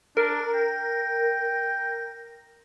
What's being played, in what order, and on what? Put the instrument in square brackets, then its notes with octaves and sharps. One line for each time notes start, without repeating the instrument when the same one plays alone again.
[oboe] D4 [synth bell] A#4
[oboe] G5